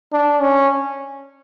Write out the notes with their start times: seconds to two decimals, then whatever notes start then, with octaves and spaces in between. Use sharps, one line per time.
0.13 D4
0.41 C#4